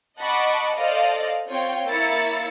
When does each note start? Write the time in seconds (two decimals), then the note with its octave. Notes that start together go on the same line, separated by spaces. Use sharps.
0.18 D#5 F#5 A5 B5 C#6 D6
0.76 A4 C5 D5 D#5 F5
1.47 C4 F4 C#5 G5
1.88 A#3 E4 C#5 E6 A6 C#7